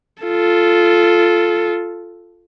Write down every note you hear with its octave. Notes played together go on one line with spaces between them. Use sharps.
F4 A4